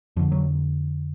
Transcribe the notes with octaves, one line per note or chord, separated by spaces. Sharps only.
F2 D3 F3
F#3